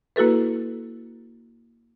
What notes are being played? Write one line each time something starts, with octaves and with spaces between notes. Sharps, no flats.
A#3 E4 F#4 A4 B4